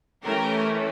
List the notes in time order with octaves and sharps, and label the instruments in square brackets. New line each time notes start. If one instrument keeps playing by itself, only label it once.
[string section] E3 A3 C#4 G4 A#4